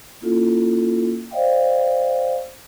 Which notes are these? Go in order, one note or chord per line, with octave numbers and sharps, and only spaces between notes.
A#3 C#4 E4 F4 A4
C5 D5 D#5 F5 G5